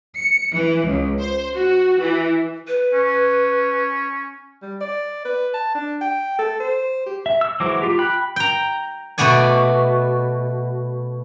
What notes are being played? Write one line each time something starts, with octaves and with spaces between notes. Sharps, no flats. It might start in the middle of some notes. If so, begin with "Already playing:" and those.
C#7
E3
C#2
C5
F#4
E3
B4
C#4
G3
D5
B4
A5
D4
G5
A4
C5
G4
E5
E6
E3 F#3 G#3 C5 D6
F4 G4
G5 B5 F#6
G5 A#5
B2 A3 F#4 D5 G#5